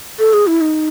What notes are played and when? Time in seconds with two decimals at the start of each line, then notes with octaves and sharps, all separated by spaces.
0.19 A4
0.33 G#4
0.47 E4
0.61 D#4